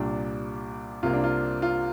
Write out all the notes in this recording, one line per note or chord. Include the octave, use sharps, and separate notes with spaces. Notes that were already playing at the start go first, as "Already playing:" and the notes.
Already playing: C2 A#2 G3 D4
C2 C3 A#3 F4
D4
F4
F4